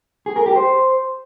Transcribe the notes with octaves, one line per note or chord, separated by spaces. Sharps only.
G#4
A#4
G4
C5